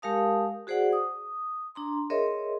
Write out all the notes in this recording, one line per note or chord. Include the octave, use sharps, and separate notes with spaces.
G#3 G4 A#4 F5 A5 D#6
F#4 G#4 C5 D5 F#5
D#6
D4 A#5 C6
G#4 A#4 C#5 D#5 E5 C6